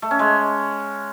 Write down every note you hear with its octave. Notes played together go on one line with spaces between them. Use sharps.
A3
C#4
G#3